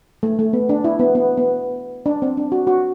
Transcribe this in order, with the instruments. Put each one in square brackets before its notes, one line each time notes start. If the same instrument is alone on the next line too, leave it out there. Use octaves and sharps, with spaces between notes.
[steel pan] A3
A3
B3
D4
E4
B3
B3
B3
D4
C4
D4
F#4
F#4